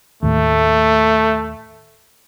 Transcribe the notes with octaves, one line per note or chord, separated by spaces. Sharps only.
D#2 A2 A3